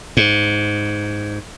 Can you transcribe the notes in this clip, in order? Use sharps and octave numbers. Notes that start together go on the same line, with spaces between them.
G#2